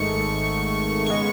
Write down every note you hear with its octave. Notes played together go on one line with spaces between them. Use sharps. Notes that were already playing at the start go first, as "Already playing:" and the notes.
Already playing: G#1 G#2 D#3 A3 C#6
C#3 G#3 B3 C#6